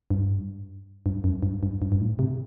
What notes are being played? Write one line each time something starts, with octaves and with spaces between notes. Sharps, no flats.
G2
G2
F#2
G2
G2
G2
G2
A2
C3